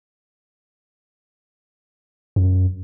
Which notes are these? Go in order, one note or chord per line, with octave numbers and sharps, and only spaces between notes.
F#2